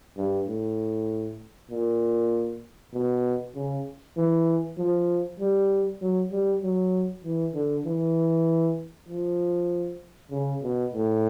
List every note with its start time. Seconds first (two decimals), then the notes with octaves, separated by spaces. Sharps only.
0.17 G2
0.47 A2
1.71 A#2
2.94 B2
3.56 C#3
4.17 E3
4.78 F3
5.40 G3
6.02 F#3
6.31 G3
6.63 F#3
7.24 E3
7.54 D3
7.86 E3
9.09 F3
10.31 C#3
10.63 B2
10.93 A2